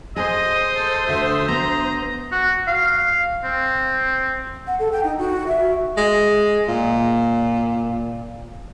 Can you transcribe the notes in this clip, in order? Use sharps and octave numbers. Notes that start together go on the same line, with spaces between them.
G#4 C5 D#5 D#6
A4
D2 D3 F#4 E5
B3 D4 A#5
F#4
F5
C4
F#5
A4
G5
D#4
F#4
E5
G#3
A#2